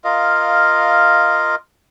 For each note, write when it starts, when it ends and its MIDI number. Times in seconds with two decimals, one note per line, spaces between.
0.04 1.55 65
0.04 1.55 70
0.04 1.55 75
0.04 1.55 77